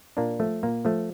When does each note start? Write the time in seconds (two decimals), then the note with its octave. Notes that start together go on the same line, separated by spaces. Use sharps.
0.17 A#2 A#3 D4
0.40 F3 A3
0.63 A#2 A#3
0.85 F3 A3